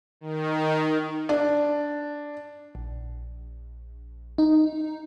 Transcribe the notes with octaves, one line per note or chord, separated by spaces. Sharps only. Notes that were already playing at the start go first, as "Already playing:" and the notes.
D#3
D4
A#1
D#4